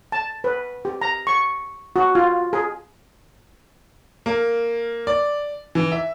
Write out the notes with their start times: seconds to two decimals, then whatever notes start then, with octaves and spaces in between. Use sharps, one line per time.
0.12 A5
0.44 B4
0.85 G4
1.01 A#5
1.27 C#6
1.96 F#4
2.15 F4
2.53 G#4
4.26 A#3
5.07 D5
5.75 E3
5.92 E5